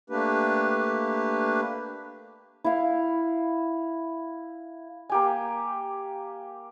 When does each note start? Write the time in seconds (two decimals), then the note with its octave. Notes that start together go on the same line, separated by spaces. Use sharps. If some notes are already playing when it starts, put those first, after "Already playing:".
0.10 A3 A#3 D4 G4 B4
2.64 E4 F5
5.09 A#3 G4 G#5